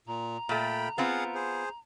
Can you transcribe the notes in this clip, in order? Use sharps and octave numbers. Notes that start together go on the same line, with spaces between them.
A#2 A#5
A#2 A3 G5 B5
B3 C4 F4 G#4 F5 F#5
G#4 C5